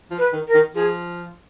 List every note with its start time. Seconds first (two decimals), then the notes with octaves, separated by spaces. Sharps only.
0.11 F3
0.18 B4
0.33 D#3
0.47 A#4
0.54 D#3
0.75 F3 G#4